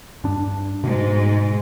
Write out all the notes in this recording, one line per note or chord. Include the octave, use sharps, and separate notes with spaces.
G2 D4
G#2 B2